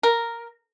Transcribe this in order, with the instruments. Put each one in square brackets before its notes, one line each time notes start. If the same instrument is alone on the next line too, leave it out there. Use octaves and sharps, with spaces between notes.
[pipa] A#4